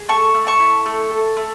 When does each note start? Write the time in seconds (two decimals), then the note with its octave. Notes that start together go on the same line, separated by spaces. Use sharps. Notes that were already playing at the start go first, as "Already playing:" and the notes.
Already playing: G#4
0.09 A3 A5 C#6
0.34 A3
0.47 A5 C#6
0.60 E4
0.86 A3
1.11 A4
1.37 A3